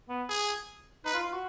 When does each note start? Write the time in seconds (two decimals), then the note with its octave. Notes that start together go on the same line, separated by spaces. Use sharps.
0.09 B3
0.29 G#4
1.05 D#4 B4
1.13 F4
1.24 F4
1.33 F#4